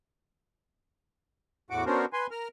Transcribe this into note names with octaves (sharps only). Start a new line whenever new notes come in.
E2 A2 F#4 F#5 D6
B3 C#4 D4 F#4 A#4 C5
B4 G#5 C6
A#4 F6